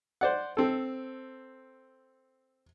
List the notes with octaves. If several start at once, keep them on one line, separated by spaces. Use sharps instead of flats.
C5 D5 F#5
C4 A4